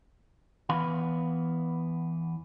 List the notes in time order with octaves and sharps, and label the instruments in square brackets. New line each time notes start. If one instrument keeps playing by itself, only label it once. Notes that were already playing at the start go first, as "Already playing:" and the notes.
[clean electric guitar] E2 E3 B3 F5 B5